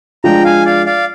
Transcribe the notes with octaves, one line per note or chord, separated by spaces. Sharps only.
F3 G#3 D4 F4 G5 A#5
F5 G#5
D5 F5
D5 F5